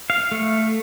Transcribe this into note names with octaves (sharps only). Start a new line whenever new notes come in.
F5
A3